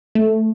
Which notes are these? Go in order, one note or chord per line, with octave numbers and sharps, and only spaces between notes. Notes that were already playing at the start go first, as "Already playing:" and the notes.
A3